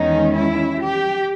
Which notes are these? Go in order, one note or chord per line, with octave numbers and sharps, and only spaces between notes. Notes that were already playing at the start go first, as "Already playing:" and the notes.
Already playing: E2 D#3 G#3 C#4 D#4
E4
G4